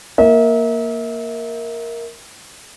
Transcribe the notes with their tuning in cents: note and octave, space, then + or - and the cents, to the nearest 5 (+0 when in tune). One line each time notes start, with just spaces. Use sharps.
A#3 +0 E5 -35